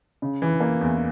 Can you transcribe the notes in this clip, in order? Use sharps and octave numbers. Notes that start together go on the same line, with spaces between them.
C#3
E3
A#3
E2